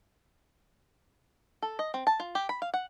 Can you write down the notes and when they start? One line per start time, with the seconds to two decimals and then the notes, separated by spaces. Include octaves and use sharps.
1.62 A4
1.79 D#5
1.94 C4
2.07 A5
2.20 F4
2.35 G4
2.49 B5
2.62 F5
2.74 F#5